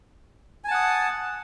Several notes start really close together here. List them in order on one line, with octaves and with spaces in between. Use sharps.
G#5 A5 F#5 D#6